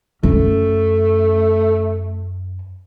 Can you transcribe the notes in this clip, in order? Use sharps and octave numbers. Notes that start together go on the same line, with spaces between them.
F#2 A3 C#4